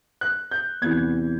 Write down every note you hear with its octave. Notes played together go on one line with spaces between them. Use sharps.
F#6
G6
E2 C3 E3 G#6